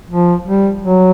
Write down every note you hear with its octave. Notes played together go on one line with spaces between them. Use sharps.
F3
G3
F#3